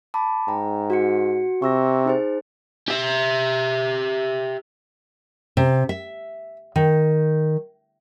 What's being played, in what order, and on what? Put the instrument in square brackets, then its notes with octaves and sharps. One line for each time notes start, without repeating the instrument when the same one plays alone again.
[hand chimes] A5 B5 D6
[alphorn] G#2 [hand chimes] G5 A#5
[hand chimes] F#4 F#5 C#7
[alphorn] C3 [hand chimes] C#6 E6 A#6
[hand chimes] D#4 G#4 C5
[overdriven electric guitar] G4 E5
[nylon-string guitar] C3
E5
D#3